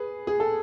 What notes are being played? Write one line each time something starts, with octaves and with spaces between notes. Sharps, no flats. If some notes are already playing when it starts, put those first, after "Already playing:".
Already playing: G#4 B4
G#4
A4